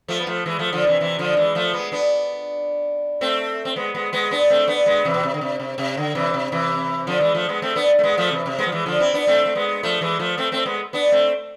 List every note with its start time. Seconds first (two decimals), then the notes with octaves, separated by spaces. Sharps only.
0.08 F3 A3
0.20 B3
0.27 F3 A3
0.46 E3 G#3
0.59 F3 A3
0.72 D3 F3
0.87 C3 E3
1.00 C3 E3
1.19 D3 F3
1.37 E3 G#3
1.55 F3 A3
1.74 G#3 B3
1.92 B3 D4
3.21 A3 C4
3.65 C4
3.76 G#3 B3
3.95 G#3 B3
4.13 G#3 B3
4.31 B3 D4
4.50 A3 C4
4.68 B3 D4
4.86 G#3 B3
5.05 C3 E3
5.14 B2
5.23 C3
5.34 D3
5.41 C3
5.60 C3
5.78 C3
5.97 D3
6.15 C3 E3
6.34 C3
6.52 C3 E3
7.07 D3 F3
7.21 E3 G#3
7.35 F3 A3
7.49 G#3 B3
7.62 A3 C4
7.76 B3 D4
7.99 A3
8.03 G#3 B3
8.18 F3 A3
8.31 C3 E3
8.46 C3
8.59 G#3 B3
8.66 F3
8.72 E3 G#3
8.86 D3 F3
9.00 C4 E4
9.14 B3 D4
9.27 A3 C4
9.46 A3
9.55 G#3 B3
9.83 F3 A3
10.01 E3 G#3
10.19 F3 A3
10.38 A3 C4
10.52 A3 C4
10.66 G#3 B3
10.93 B3 D4
11.12 A3 C4